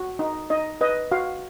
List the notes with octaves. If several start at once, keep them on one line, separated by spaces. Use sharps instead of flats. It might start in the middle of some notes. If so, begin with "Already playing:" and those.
Already playing: F#4
D#4
D#4 D#5
B4 D#5
F#4 F5